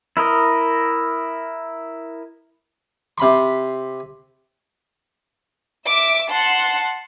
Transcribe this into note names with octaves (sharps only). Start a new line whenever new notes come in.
E4 A#4 D#5
C3 B5 C6
E5 D6
F#5 A5 C6